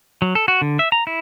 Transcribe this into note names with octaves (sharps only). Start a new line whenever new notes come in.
F#3
A4
F#4
D3
E5
A#5
E4